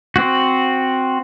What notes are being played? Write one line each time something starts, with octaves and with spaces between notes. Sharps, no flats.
C4 F#4